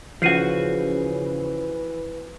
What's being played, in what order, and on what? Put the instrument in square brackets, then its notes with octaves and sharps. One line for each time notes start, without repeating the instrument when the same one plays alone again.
[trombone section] C#3 [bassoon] E3 [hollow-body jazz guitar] F3 F#4 [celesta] G6 C7 D#7